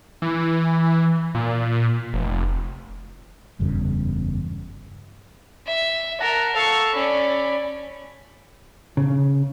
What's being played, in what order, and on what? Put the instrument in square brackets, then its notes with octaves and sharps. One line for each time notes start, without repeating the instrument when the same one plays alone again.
[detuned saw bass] E3
A#2
F1
[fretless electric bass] F#1 E2 G2 C#3
[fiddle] E5
[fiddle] A#4 [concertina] F#5 A5 A#5
[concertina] A4 A5 [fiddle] F5 C#6
[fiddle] C#4 D5 [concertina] B5
[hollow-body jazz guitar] C#3